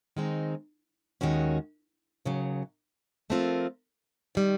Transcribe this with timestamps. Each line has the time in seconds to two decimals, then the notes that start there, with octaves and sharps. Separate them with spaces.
0.17 D#3 G#3 C4 D#4
1.21 D#2 D#3 G#3 C#4 F#4
2.25 D#2 C#3 F#3
3.30 F3 A3 C4 F4 A#4
4.35 D#3 G3